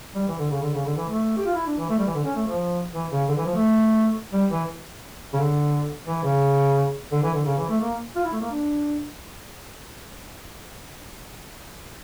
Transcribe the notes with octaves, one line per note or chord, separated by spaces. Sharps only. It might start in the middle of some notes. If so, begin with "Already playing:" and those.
G3
E3
D3
C#3
D3
C#3
D3
E3
A3
G4
F4
E4
D4
E3
A3
G3
E3
D3
C#4
A3
F3
E3
C#3
D3
E3
F3
A3
G3
E3
C#3
D3
E3
C#3
D3
E3
D3
C#3
E3
A3
A#3
F4
E4
A3
A#3
D4